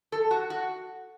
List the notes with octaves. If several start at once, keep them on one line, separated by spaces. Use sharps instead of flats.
A4
F#4
F#4